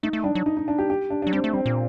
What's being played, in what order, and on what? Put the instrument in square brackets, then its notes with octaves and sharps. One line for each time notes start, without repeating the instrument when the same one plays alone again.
[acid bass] A3 [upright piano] D#4
[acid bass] A3
[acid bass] G3 [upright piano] D4
[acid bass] F#3
[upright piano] D#4
D#4
D4
G4
G4
D4
D4
[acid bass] F#3
[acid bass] G3 [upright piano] C4
[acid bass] A3
[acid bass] G3 [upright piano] C4
[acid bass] A#2